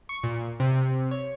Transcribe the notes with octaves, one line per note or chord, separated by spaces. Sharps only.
C#6
A#2
C3
C#5